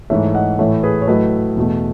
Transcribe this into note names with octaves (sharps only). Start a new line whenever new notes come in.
G#2 E3 A3 C#5 E5
D#5 F#5
A2 E3 A3 C#5 E5
G#4 B4
C#5
A2 F#3 A3 B4 D#5
E2 B2 A3